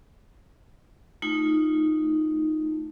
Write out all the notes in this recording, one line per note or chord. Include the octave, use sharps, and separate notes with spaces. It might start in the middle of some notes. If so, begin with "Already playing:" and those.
A3 D#4 F4